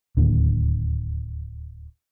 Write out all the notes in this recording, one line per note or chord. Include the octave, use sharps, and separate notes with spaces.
D1 D#2 D3